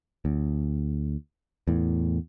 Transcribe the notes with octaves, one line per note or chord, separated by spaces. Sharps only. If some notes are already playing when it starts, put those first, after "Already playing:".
D2
E2 A2